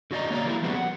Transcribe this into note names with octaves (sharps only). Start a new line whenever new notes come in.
D3 F#4 D5 D#5 A#5
A#3 C#5 D5 A#5
E3 G3 A#3 E4
F3 G3 B3 C#4 F#4 G#4
F#5